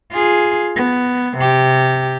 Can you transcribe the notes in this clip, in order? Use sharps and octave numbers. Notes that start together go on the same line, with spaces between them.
F4 G#4
B3
C3 G4